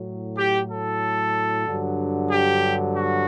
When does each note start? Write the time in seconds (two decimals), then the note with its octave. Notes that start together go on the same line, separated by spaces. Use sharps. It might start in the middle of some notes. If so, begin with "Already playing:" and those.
Already playing: A2 F#3
0.38 G4
0.71 A4
1.67 G2 D3 F#3
2.31 G4
2.96 F#4